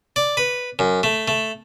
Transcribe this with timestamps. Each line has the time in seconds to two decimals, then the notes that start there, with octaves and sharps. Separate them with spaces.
0.16 D5
0.37 B4
0.79 F#2
1.03 A3
1.28 A3